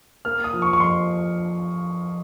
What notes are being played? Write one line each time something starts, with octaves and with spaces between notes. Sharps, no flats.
A#3 F6
D#6
F3
C#6
C#6
F2 C6